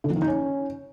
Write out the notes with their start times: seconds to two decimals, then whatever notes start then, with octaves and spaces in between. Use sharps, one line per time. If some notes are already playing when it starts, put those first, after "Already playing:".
0.04 D3
0.10 F3
0.16 D#3
0.22 D#4
0.28 C#4